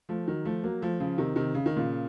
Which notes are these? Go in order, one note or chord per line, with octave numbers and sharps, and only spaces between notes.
F3 A3
D#3 F#3
F3 A3
F#3 A#3
F3 A3
C#3 F3
C3 D#3
C3 D#3
C#3
D#3
A#2 C#3